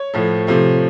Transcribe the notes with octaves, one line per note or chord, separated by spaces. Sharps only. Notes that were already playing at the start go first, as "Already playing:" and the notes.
Already playing: C#5
A2 F3 A3
C3 F3 A3